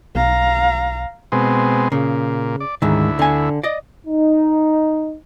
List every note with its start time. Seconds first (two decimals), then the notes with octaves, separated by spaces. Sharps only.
0.15 B1 F5 A#5
1.32 B2 G#3 C4
1.92 A#2 C#3
2.60 D5
2.82 D2 G#2 D#3 E4
3.19 D3 G#5
3.63 D5 D#5
4.07 D#4